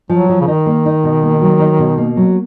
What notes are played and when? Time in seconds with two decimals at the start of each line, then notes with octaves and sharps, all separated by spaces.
0.09 F3 F#3
0.29 F3
0.41 C#3
0.47 D#3 D#4
0.66 A#3
0.86 D#4
1.04 B2
1.23 A#3
1.42 F#3
1.60 D#4
1.79 B2
1.98 A#3
2.17 F#3